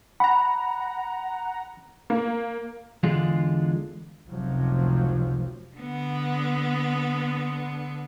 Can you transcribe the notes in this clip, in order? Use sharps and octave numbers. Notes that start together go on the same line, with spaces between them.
F#5 A#5 B5
A#3
E2 D3 G#3 D4 F4
F1 C#2 C3 F3 F#3
D3 B3